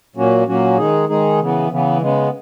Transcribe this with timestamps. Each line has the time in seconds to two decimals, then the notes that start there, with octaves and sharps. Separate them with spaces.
0.16 A#2 F#3 A#3 C#4 F#4
0.47 A#2 F#3 A#3 C#4 F#4
0.78 D#3 G#3 D#4 G#4
1.09 D#3 G#3 D#4 G#4
1.40 C#3 E3 B3
1.70 C#3 E3 B3
2.01 C#3 G#3 B3